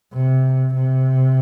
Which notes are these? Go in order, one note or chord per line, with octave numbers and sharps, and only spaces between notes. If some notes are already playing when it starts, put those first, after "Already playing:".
C3
C3